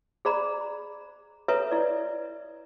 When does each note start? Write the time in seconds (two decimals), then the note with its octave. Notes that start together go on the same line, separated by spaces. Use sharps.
0.25 G#4 C5 D5 A#5 B5
1.48 A4 B4 C#5 E5 A#5
1.71 E4 D5